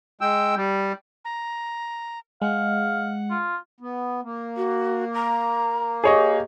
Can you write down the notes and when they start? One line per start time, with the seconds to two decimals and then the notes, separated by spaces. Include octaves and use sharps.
0.21 G#3 G5 E6
0.57 G3
1.25 A#5
2.42 G#3 F5 F#5
3.30 F4
3.80 B3
4.23 A#3
4.57 F#4
5.14 A#5
6.04 G4 G#4 C#5 D#5